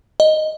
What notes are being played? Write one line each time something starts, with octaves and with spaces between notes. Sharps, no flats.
D#5